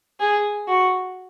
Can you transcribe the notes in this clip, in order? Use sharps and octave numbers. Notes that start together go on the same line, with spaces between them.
G#4
F#4